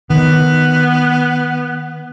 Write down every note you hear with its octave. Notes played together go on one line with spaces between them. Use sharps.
D#3 B3